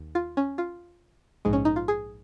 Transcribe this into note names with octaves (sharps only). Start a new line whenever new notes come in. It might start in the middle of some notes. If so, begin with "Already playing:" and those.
Already playing: D#2
F4
C#4
F4
A#1 G#2 G#3
C#4
D#4
F4
G#4